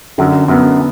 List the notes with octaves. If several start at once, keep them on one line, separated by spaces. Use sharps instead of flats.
F#2 D3
F#2 B3